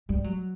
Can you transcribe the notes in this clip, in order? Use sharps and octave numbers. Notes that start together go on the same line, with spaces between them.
G3
F#3